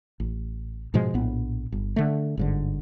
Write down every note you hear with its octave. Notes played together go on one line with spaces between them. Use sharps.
A1
G#2 B2 F3 G#3
A#1 A2 B3
G1
D3 A3
G1 G#2 D3